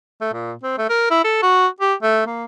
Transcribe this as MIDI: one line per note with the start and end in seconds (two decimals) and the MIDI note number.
0.21 0.33 57
0.33 0.53 46
0.63 0.73 60
0.78 0.89 57
0.90 1.11 70
1.11 1.23 64
1.24 1.41 69
1.42 1.67 66
1.80 1.94 67
2.02 2.25 57
2.26 2.45 58